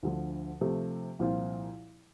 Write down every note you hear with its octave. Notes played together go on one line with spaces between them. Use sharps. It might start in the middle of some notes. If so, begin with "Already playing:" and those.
D2 D3 F3
C3 F3 A3
C2 A#2 F3 C4 F4